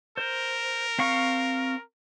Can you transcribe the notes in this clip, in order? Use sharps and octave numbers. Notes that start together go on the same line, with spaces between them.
A#4 C5
C4 F5 C#6